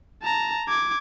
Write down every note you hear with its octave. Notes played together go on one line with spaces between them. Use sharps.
A5 A#5
D6 G#6